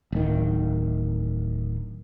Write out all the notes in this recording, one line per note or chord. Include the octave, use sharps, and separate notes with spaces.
D1 D#3